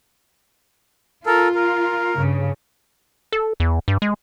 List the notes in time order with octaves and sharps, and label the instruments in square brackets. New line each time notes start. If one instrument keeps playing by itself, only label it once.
[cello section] F4 [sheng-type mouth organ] A4 A#4
[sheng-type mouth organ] A#4
[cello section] G2 C#3
[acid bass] A4
E2
G2
G#3